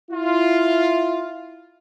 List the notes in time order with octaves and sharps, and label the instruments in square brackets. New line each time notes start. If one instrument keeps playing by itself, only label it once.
[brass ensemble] E4 F4